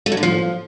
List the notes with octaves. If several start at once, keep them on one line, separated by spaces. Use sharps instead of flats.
A3
F#3
D3
F3